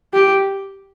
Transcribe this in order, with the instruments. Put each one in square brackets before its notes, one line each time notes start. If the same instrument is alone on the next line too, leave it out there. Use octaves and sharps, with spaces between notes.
[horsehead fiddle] G4